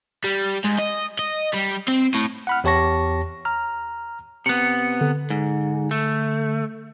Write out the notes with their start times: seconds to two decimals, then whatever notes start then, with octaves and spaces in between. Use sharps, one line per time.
0.24 G3
0.64 G#2
0.78 D#5
1.19 D#5
1.54 G3
1.88 C4
2.14 A2
2.47 F#5 B5 F6
2.64 E2 G4 C#5 A5 C#6 A#6
3.45 A#5 F6
4.46 C3 B3 C#7
5.01 D3
5.30 G#2
5.91 A3